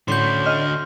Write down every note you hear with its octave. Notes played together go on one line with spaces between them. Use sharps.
A2 D3 C#4 D4 F#4 C6 G6
D#5 F6